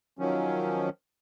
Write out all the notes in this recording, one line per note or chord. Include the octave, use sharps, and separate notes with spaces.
D#3 F3 F#3 C#4